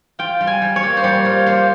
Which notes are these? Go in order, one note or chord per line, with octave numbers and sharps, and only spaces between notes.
F4 G5
G3
G#5
G3
C#5
A#3
C5
G3 C#5
F4 C#5
A#3 C5